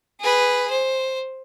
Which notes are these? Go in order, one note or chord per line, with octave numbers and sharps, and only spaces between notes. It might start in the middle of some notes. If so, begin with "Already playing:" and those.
G#4 B4
C5